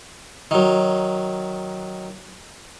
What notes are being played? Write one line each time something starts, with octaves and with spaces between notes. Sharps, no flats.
D#3 F#3